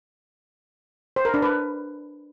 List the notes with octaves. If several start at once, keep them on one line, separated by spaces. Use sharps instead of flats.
C5
A#4
D4
B4